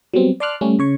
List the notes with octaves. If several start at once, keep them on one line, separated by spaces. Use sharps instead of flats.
F#3 G3 B3 C4
D5 A5 C6 D6 F6 F#6
G3 A3 C#4
C#3 C#5 C#6